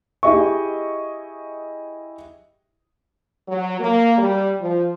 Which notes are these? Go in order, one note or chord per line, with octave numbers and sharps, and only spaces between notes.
E4 G4 G#4 D#5 E5 C#6
F#3
A#3
G3
F3